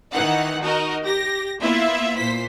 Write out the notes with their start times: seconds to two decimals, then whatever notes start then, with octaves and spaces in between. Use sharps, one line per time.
0.12 D#3 E3 D#4 F#5 F#6
0.61 D#4 F#4 A#4 D#5
1.03 G4 A#6
1.60 A#3 B3 E4 F4 E5
2.17 A#2 C5 B6